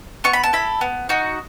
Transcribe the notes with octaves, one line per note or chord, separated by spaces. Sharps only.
B3 C#6
B5
A5
E4 A4 B5
B3
D#4 F#4